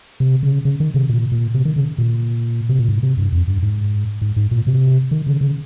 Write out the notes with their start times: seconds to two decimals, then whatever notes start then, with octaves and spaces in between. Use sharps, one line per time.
0.20 C3
0.43 C#3
0.65 C#3
0.80 D#3
0.94 C3
1.09 A#2
1.32 A#2
1.54 C3
1.65 D#3
1.76 C#3
1.98 A#2
2.69 C3
2.79 A#2
2.89 G#2
3.03 C3
3.18 G2
3.32 F2
3.48 G2
3.63 G#2
4.22 G#2
4.36 G#2
4.51 A#2
4.67 C3
5.11 D#3
5.27 C#3
5.41 C#3